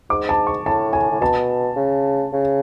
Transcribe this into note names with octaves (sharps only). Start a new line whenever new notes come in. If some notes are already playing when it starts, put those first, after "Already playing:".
G#2 D6
A5
C#6
A2 A5
G#5
A2
B2 A5
C#3
C#3